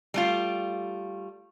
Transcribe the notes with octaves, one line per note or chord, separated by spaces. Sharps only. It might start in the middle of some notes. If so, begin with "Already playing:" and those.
G3 A3 F4